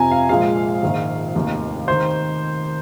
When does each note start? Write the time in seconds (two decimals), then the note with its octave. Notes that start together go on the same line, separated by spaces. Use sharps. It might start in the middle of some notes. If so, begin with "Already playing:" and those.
Already playing: F2 C3 F3 G#5 A#5
0.11 F5
0.29 A#1 A#2 F3 G#3 F5
0.82 A#1 G#2 D#3
1.35 F1 D#2 D#3
1.88 D#3 C5